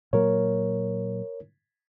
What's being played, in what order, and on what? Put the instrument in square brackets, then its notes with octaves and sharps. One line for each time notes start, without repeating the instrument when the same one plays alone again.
[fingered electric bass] A#2 F#3 A#3 [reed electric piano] A#4 C#5